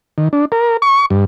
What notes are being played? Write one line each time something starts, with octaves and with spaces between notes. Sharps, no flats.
D#3
D4
A#4
C#6
G2